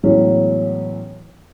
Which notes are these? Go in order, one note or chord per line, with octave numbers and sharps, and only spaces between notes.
A2 E3 F#3 G#3 B3 C#4